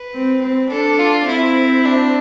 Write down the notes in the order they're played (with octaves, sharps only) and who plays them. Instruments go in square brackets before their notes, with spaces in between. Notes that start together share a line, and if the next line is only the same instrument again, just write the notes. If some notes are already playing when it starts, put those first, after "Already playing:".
Already playing: [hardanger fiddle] B4
[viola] C4
C4
[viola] D4 [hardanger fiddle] A4
[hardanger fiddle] F4
[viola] C4 [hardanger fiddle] E4
[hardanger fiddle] D4